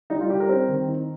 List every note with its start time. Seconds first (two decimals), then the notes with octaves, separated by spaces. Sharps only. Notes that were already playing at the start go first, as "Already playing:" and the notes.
0.10 G3 D#4
0.20 F4
0.30 G3 G4
0.40 A#4
0.49 C4
0.68 D#3
0.88 D#4